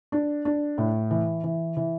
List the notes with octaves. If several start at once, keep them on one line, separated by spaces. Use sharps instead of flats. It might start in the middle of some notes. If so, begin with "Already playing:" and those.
D4
D4
A2
E3
E3
E3